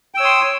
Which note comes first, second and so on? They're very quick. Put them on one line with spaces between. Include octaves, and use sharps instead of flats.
G5 E6 C#5 D#6 C6